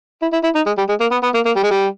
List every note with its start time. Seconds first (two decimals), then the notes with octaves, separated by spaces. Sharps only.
0.22 E4
0.32 E4
0.43 E4
0.55 D#4
0.66 G#3
0.78 G3
0.89 G#3
1.00 A#3
1.11 B3
1.23 B3
1.34 A#3
1.46 A#3
1.56 G3
1.63 G#3
1.71 G3